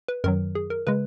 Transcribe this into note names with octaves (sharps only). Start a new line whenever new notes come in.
B4
F#2 D#3 F#3 A#4
G#4
A#4
C#3 G#3 B4